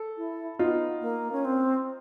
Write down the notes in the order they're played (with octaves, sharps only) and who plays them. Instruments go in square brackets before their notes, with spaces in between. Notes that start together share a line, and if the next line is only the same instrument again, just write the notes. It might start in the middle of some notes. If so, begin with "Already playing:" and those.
Already playing: [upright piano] A4
[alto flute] E4
[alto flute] B3 [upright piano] D#4 F4
[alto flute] A#3
C#4
C4